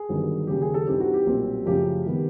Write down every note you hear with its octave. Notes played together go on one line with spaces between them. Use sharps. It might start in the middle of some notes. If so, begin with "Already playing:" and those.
Already playing: G#4
G1 G2 D#3 F#3
D#2 C#3 F#3 G4
G#4
A4
G2 E3 G3 C4 D#4 G4
F#4
G4
B1 A#2 G3 C4
F#2 C#3 F3 A3 G4
C3 D#3 G3 B3